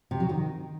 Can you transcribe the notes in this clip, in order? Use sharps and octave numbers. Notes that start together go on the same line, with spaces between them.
C3
F#3
D#3